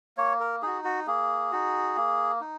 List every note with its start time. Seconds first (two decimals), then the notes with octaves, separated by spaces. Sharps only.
0.17 A#3 C#5
0.40 A#4
0.62 D#4 F#4 G#4
0.84 F#4
1.07 A#3 G#4
1.52 D#4 F#4
1.96 A#3
2.41 D#4